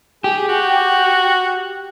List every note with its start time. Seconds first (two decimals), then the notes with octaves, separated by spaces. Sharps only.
0.24 G4 G#4
0.49 F#4